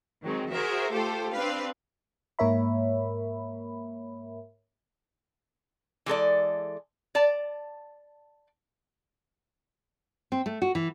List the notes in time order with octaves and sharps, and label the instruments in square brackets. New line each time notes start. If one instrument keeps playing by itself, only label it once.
[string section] D#3 F#3 G#3 C4
F#4 G#4 A#4 C5 E5
A3 F4 G4 A4 C5
C4 D4 B4 F5
[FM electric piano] G#2 A#3 A#4 C#5 E5 B5
[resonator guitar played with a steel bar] E3 G#3 A4 D5
D5 A5
[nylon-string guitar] C4
A3
F#4
E3